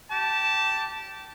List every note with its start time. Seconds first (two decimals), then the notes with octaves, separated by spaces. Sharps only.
0.11 G4 A5